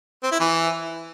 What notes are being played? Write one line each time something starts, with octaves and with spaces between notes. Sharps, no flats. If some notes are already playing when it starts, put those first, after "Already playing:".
C4
E4
E3